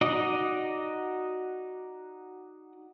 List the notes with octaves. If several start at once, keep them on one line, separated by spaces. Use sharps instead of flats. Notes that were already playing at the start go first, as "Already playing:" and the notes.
D#4 F#4 D5 D#5